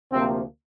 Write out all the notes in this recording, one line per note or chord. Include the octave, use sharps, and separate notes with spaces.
D2 C3 F3 A#3 C4